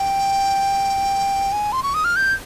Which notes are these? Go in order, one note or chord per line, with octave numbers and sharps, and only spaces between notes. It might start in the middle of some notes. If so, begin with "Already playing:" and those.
Already playing: G5
G#5
C6
C#6
D#6
F6
G6